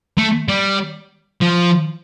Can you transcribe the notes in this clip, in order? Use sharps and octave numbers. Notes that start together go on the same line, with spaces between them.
A3
G3
F3